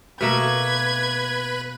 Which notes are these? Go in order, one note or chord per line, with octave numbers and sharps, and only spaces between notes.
B2 A3 A#3 B4 B5 G#6